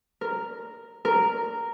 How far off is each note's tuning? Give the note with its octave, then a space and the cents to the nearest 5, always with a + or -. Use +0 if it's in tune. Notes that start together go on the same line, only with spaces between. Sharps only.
A#4 -5
A#4 -5